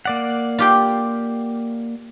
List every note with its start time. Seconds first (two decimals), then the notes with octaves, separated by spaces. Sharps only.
0.05 A#3 D5 F#5
0.59 F4 G4 G5